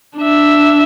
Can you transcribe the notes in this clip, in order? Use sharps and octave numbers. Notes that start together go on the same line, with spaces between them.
D4 E5